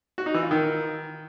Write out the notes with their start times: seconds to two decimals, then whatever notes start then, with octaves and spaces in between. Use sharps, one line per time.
0.18 F#4
0.26 D#4
0.34 E3
0.43 F4
0.51 D#3